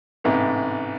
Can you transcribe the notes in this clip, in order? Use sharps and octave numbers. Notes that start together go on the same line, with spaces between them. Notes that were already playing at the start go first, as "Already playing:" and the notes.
A1 G#2 C3 B3